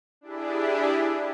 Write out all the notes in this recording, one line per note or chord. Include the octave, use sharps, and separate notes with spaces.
D4 E4 G4 G#4